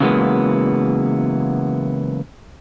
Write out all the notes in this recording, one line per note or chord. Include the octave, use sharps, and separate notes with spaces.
C#3 E3 F#3 G#3 A#3 B3